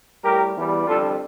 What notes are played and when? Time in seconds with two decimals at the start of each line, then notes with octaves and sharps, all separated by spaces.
0.24 A2 G3 G4 A#4
0.55 E2 E3 G3
0.86 F2 D3 G3 F4 A4